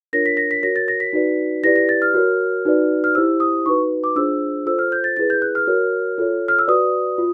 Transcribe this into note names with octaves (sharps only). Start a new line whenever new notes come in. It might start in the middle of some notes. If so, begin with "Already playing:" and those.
D4 F4 A#4 C#5 A#6
B6
A#6
B6
F#4 A#4 C#5 A#6
A6
A#6
B6
D#4 F#4 B4 D5
E4 G4 B4 D5 A#6
A#6
A6
F6
F#4 A#4 C#5
D#4 F#4 B4 D5
F6
E4 G4 C5 E6
D#6
D#4 F#4 B4 C#6
D6
D4 F4 G#4 C5 E6
F4 A4 C5 E6
F6
G6
A6
E4 G#4 B4 A6
G6
F#6
F6
F#4 A#4 C#5
F4 A4 C#5
F6
E6
F#4 B4 D5 D#6
F4